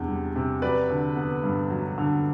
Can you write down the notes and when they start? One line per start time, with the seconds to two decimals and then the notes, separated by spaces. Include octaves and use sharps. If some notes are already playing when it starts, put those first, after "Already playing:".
Already playing: E2 C3 D4
0.08 G3
0.36 C3
0.62 F#3 B4 D5
0.90 D3
1.17 B3
1.44 G2
1.70 F#3
1.98 D3